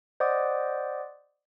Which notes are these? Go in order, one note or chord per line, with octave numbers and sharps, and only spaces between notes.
C5 D5 D#5 F#5 D6 D#6